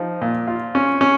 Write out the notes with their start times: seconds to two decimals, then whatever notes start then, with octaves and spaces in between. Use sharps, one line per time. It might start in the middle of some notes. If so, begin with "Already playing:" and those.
Already playing: F3 D#4
0.22 A#2
0.47 F4
0.75 C#4
1.01 C#4